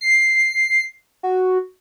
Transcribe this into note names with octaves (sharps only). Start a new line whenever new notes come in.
C7
F#4